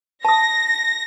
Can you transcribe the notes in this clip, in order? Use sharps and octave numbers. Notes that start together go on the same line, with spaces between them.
A5 D#6 A#6